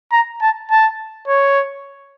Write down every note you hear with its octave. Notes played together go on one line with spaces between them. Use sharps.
A#5
A5
A5
C#5